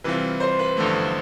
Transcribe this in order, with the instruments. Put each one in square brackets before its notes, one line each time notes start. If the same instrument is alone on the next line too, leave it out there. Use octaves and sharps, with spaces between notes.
[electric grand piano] C3 E3 G3 C4 F4 [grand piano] B4
[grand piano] C5
B4
[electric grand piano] A1 G2 D3 F3 A3